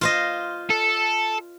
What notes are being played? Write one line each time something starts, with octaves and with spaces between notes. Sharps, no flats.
F4 C5 D#5
A4